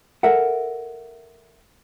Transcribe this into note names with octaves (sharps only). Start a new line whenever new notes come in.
A4 A#4 E5 F#5